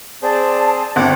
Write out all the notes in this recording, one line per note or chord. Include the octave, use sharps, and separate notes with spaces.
C4 G#4 C5 D5 A5
G1 C4 F#5 D6